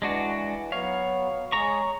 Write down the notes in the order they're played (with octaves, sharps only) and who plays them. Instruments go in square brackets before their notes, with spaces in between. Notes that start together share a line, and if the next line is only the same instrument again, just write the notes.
[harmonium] E3 [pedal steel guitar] G#3 D4 F#4
[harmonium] F#3 B3 [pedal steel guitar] C#5 F5
[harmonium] G#3 G#4 [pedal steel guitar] C#5 A#5 C#6